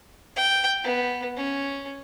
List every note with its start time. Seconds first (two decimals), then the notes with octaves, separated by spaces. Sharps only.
0.36 G5
0.83 B3
1.37 C#4